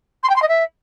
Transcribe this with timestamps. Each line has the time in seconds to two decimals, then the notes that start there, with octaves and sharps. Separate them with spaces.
0.23 C6
0.30 G5
0.36 C6
0.42 D#5
0.48 E5